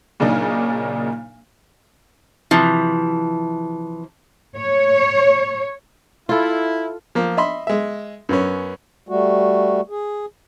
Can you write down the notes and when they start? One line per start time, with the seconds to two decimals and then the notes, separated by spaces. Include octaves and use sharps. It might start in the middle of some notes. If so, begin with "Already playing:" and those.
0.20 A#2 C#3 F#3 D4 D#4
2.51 C3 E3 F3
4.57 C#5
6.29 E4 F4 A4
7.15 F3 A#3
7.37 D#5 E5 B5 C6
7.67 G#3 E5
8.29 F#2 B3 C#4
9.09 G3 A3 F#4
9.90 G#4